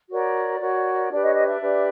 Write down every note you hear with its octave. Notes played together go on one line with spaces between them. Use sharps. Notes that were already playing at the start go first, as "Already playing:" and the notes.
F#4 A#4 C#5 D5
F#4 A#4 C#5
D4 G4 B4 D5
C#5 D#5
C#5 D#5
D5 E5
D4 G4 B4